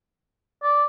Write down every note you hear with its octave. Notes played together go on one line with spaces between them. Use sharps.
D5